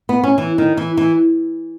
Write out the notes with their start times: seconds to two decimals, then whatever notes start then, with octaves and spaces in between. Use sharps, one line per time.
0.09 B3
0.23 C#4
0.38 E3
0.58 D#3
0.77 E3
0.97 E3